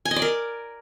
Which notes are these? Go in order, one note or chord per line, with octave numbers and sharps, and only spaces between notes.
G#5
D#5
D5
A#4